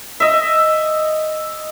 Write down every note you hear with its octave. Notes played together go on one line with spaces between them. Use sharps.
D#5 E5